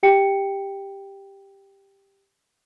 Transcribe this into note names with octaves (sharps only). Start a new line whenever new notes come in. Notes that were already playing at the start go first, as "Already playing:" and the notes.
G4 G5 C#7